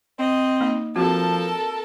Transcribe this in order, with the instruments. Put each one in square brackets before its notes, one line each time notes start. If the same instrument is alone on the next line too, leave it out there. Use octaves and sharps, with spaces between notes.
[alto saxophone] C4 [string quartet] D#5
[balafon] A#3 D#4
[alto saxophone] F3 [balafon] C4 F#4 [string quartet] A4 A#4 A5